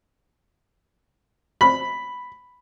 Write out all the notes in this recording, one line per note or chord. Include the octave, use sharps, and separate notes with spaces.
B5